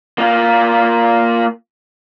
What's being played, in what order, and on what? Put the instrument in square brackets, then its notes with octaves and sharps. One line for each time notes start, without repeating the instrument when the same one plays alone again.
[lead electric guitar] A#3 F4